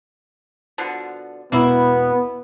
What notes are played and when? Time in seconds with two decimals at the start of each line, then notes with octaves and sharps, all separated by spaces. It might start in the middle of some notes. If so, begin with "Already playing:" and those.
0.78 B2 D3 F3
1.52 E1 B2 A#3 B3 E4